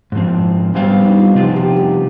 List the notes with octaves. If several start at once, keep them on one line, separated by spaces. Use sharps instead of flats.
G#2 F3 C4
G3 B3 C4 G4 C5 F5
D4
D#4
F4
C3 F3 C4 F4
G4
G4